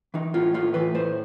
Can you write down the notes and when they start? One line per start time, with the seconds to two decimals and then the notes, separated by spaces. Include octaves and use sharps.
0.14 E3 D#4
0.34 A2 F4
0.54 A2 F4
0.74 E3 B4
0.95 A2 C5